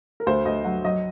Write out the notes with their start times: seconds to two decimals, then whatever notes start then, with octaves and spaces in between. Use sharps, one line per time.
0.20 A#4
0.26 D2 C5
0.45 D2 D#5
0.64 F#3 F#5
0.85 F#3 D#5